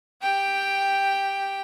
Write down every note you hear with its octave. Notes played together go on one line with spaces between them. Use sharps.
G4 G5